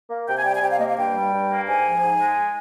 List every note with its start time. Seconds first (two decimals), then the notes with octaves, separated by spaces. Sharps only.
0.10 A#3
0.27 C3 G5
0.36 G#5
0.44 G3 G5
0.54 G#5
0.62 C3 G5
0.70 F5
0.79 A#3 D#5
0.88 F5
0.97 G2 G5
1.15 G3
1.32 G2
1.50 A#3
1.67 G#2 G#5
1.84 F3
2.02 G#2
2.20 G#3